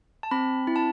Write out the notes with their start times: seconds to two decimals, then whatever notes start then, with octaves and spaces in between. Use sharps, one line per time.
0.23 A5
0.31 C4 B5
0.67 E4 B5
0.76 A5